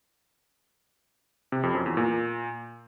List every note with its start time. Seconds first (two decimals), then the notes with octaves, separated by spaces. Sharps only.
1.52 C3
1.63 F2
1.75 F#2
1.86 E2
1.97 A#2